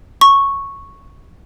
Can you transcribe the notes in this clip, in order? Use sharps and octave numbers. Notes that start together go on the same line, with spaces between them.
C#6